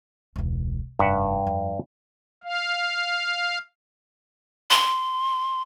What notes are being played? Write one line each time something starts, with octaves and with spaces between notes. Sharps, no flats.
E1 C#2
F1 G2 E5 F#5
F2 F3
F5
C6